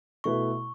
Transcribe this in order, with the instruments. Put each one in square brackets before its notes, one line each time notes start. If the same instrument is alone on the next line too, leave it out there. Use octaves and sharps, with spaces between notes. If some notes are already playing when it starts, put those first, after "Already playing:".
[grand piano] B2 A3 E4 B4 [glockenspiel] C#6